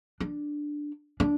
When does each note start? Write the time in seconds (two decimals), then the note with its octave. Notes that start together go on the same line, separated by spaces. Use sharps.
0.20 D4
1.20 D4